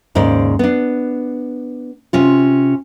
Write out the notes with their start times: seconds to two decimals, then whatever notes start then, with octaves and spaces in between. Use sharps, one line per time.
0.15 D#2 G#2 C#3 C5 D5
0.59 B3 D4
2.13 C3 C#4 F4